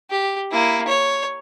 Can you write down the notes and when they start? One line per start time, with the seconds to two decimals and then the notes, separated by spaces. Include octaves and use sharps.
0.11 G4
0.51 A#3 E4
0.87 C#5